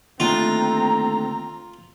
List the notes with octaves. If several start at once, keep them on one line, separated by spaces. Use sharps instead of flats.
D#2 D3 A3 C4 F4 A#5